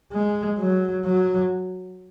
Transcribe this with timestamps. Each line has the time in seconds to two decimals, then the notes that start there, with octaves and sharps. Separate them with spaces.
0.12 G#3
0.59 F#3
1.05 F#3